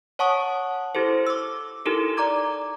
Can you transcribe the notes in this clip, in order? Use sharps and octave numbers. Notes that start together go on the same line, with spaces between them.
C#5 F#5 A5 C#6 D#6
E4 G4 A4 C5
D6 E6
D#4 E4 G4 A4 A#4
D5 A#5 D6 G#6